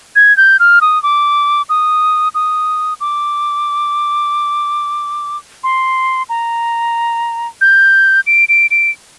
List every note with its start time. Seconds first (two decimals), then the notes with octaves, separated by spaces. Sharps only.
0.16 G#6
0.37 G6
0.60 F6
0.81 D#6
1.03 D6
1.69 D#6
2.35 D#6
3.01 D6
5.64 C6
6.29 A#5
7.61 G6
8.27 D7
8.49 D7
8.71 D7